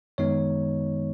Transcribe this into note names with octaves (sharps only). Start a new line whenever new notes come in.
F#2 D#3 G#3 B3 D#4 C#5